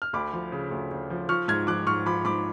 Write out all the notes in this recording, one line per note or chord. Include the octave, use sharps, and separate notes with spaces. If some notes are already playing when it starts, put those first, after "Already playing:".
F6
D2 B5 D6
F3
C#3
D2
D2
F3
F3 C#6 F6
G#2 F6 G#6
F3 D6 F#6
G#2 C#6 F6
F3 B5 D6
G#2 B5 D6